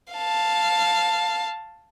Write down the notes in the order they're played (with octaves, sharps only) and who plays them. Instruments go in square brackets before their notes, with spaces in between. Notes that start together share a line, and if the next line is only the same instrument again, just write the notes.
[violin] F5 A5